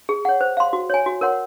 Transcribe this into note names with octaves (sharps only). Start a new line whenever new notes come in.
G#4
C#5 F#5
C5
F5 C6
F#4
C#5 G#5
F#4
A#4 C#5 F#5 C6